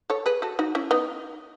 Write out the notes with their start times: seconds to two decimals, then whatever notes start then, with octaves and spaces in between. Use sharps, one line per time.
0.10 A4 C#5
0.26 G#4 B4
0.42 F#4 A4
0.59 D#4 F#4
0.75 C#4 E4
0.91 B3 D#4